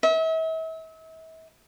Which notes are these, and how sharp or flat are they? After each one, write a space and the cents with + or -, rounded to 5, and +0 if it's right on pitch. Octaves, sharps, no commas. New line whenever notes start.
E5 -40